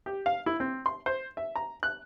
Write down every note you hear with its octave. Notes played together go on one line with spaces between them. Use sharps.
G4
F5
E4
C4
C6
C5
E5
A#5
F#6